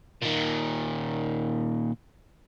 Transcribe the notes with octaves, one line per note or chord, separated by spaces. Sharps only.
A#2 D#3